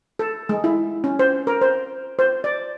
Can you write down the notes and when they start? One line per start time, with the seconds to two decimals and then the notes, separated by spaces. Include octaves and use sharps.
0.19 A4
0.49 G#3
0.64 E4
1.04 C#4
1.19 C5
1.47 A#4
1.61 C5
2.19 C5
2.44 D5